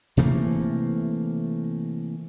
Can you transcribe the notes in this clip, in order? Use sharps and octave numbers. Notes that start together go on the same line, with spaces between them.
C3 E3 A3 A#3